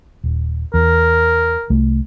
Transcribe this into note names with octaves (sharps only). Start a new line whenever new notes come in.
D#1
E2 A#4
C2 A3